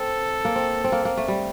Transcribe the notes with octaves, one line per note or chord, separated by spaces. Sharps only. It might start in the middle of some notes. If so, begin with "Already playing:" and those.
Already playing: C4 A4
A#3
C4
C4
A#3
A#3
A3
G3